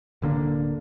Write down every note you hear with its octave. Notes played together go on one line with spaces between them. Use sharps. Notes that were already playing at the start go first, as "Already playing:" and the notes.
D1 D3 A#3 D4